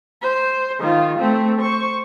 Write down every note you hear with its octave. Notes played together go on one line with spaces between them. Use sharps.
C5
D#3 F4
A3 C4
C5 C#6